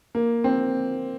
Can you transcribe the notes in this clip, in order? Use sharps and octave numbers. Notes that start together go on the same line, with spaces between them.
A#3
C4